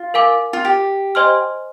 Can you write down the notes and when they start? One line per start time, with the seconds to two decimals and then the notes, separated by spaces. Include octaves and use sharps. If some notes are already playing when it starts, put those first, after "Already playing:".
Already playing: F4
0.14 A#4 F5 G#5 D6
0.53 F4
0.65 G4
1.15 C5 D#5 G#5 C6 F6